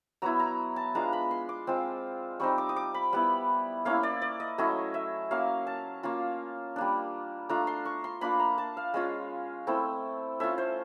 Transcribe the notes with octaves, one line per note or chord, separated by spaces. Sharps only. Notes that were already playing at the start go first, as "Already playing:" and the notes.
F#3 B3 E4 A#5
A#5
A5
G#3 B3 D4 F4 A#5
B5
C6
D6
G#3 C4 F4
G3 C4 D#4 C#6
D6
D#6
D6
B5
G3 B3 E4 F#5
A#3 C#4 E4 F5
D5
D5
D#5
F#3 A3 C#4 E4 D#5
E5
F#3 A#3 C#4 F5
A5
A#3 C#4 F4
G3 A#3 D4
A3 D4 F4 A#5
C6
C#6
C6
A#3 D4 F4 B5
A#5
A5
F5
G#3 C#4 F4
A3 C4 E4
A3 C#4 F4 E5
C5